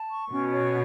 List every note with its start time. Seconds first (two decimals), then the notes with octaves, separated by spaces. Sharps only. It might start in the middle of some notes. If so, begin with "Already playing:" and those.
Already playing: A5
0.10 C#6
0.31 B2 C#4
0.52 C#5